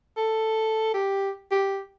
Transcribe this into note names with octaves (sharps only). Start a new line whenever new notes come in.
A4
G4
G4